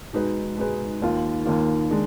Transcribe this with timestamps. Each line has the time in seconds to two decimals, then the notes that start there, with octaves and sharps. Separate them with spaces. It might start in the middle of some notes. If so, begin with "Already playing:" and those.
0.13 B2 G#3 D#4 G#4 B4
0.57 B2 G#3 D#4 G#4 B4
1.02 D#2 D#3 A#3 F4
1.46 D#2 D#3 A#3 F4
1.90 D#3 G#3 D4